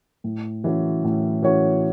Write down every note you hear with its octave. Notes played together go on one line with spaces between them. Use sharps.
A2
E3 C#4 F#4 C#5
A2
E3 C#4 F#4 C#5